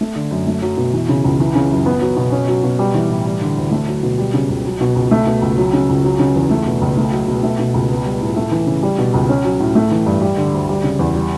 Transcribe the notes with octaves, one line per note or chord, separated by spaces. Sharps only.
A3
D3
F#2
A3
F#3
B2
E3
C#3
C#2
E3
C#3
F#2
B3
F#3
B2
C#4
F#3
B2
G3
E3
A2
G3
D3
D2
A3
F#3
B2
G3
C#3
C#2
F#3
B2
C#2
A3
B2
C#2
F#3
C#3
C#2
F#3
C#3
E2
A3
B2
C#2
A3
F#3
B2
A3
B2
C#2
B3
G3
A2
A3
E3
C#3
G3
B2
C#2
C#4
F#3
A2
A3
E3
G2
G3
D3
D2
G3
C#3
E2
G3